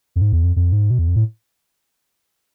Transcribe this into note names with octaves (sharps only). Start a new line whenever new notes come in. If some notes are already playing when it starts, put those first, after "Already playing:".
F2
G#2
E2
F2
F2
G#2
B2
E2
F2
A2